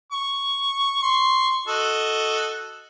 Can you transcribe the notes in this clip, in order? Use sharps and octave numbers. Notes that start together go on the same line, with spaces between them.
C#6
C6 C#6
F#4 A4 D#5